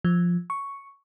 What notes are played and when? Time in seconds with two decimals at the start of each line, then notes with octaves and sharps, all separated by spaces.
0.05 F3
0.50 C#6